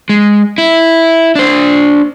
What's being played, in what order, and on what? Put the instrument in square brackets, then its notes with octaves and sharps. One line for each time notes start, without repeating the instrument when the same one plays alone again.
[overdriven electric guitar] G#3
E4
D4 C5